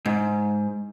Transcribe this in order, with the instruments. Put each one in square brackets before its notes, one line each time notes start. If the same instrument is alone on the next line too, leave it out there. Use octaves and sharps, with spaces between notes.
[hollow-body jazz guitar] G#2